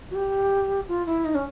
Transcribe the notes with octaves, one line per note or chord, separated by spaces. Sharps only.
F#4
G4
F4
E4
D#4
C#4